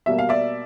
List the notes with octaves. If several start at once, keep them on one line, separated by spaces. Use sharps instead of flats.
B2 G3 A#3 E5
F5
D5 E5